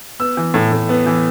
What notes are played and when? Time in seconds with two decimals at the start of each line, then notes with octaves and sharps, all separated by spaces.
0.20 B3 E6
0.37 E3
0.54 A2
0.72 A2
0.89 B3
1.06 E3